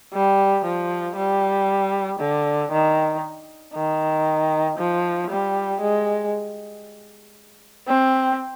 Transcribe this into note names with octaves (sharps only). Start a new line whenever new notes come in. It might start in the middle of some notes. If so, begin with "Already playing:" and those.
G3
F3
G3
D3
D#3
D#3
F3
G3
G#3
C4